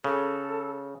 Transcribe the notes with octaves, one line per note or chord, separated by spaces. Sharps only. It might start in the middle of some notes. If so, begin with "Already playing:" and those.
C#3 A4